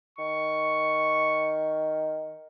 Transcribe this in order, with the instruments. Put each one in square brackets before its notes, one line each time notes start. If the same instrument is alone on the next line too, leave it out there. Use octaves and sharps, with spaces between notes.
[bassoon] D#3 [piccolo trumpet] C#6